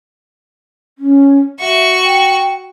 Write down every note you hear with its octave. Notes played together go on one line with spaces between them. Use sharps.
C#4
F#4 E5 C#6
G5